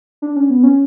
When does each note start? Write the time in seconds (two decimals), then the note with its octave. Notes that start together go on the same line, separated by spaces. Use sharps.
0.22 D4
0.36 C#4
0.50 B3
0.63 C#4